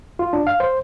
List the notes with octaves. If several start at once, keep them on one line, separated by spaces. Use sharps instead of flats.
F4
D4
F5
C5